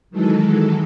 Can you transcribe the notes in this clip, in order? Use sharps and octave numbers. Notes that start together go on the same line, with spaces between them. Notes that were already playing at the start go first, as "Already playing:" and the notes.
D#3 E3 F#3 G#3 A4